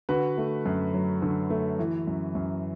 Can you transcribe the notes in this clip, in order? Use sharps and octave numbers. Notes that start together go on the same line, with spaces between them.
D3 F#4 B4
A3
F#2
F#3
D3
A3
E3
F#2
F#2